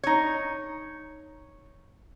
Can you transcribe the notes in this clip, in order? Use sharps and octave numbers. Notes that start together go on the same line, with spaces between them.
D#4 C#5